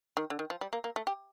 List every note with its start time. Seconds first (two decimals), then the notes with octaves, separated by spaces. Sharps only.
0.17 D#3
0.30 D3
0.39 D#3
0.50 F3
0.61 G3
0.73 A#3
0.84 A#3
0.96 A3
1.07 G4